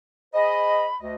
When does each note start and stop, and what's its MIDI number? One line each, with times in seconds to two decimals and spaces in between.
0.34 0.87 68
0.34 0.87 72
0.34 0.87 75
0.34 0.96 83
1.00 1.15 38
1.00 1.15 75